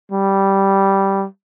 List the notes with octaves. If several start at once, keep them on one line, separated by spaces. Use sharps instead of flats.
G3